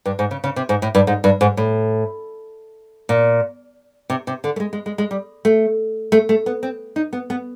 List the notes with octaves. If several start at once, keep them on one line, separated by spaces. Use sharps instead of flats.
G2
G#2
C#3
C#3
C3
G#2
A2
G2
G#2
G2
G#2
A2
A#2
C3
C3
D3
A3
G#3
G#3
G#3
G#3
G3
A3
A3
A3
B3
C4
D#4
B3
B3